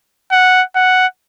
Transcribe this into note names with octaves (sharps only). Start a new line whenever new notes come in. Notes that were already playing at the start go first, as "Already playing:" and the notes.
F#5
F#5